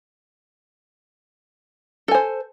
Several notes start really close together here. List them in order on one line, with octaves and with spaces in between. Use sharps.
A4 G#5 C5